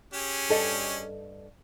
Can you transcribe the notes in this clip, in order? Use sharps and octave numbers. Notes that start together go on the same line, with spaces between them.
C#4 G4 G#4
G2 A4 D#5